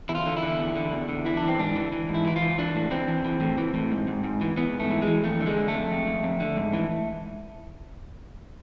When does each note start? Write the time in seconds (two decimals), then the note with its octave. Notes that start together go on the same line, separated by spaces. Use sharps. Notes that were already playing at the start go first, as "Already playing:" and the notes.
0.09 E2 E4
0.15 F4
0.26 D3
0.37 E4
0.43 D3
0.59 E2
0.75 D3
0.92 E2
1.09 D3
1.25 E3 E4
1.37 D4
1.43 E3
1.48 C4
1.59 G#2 D4
1.75 E3
1.92 E3
2.09 G#2
2.14 E4
2.25 E3 E4
2.36 F4
2.42 E3
2.58 E3 D4
2.75 A2
2.91 E3 C4
3.08 E3
3.25 E3
3.41 A2
3.58 E3
3.74 A2
3.92 G#2
4.08 G#2
4.24 G#2
4.41 E3
4.57 E3 B3
4.74 G#2
4.80 A3
4.91 E3
5.02 G#3
5.07 E3
5.24 F2 A3
5.40 D3
5.46 G#3
5.57 D3
5.68 A3
5.73 F2
5.91 F2
6.07 F2
6.23 F2
6.40 D3
6.57 G#2
6.73 E3